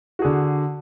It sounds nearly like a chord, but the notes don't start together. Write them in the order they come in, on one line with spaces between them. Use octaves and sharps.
F#4 G#4 D3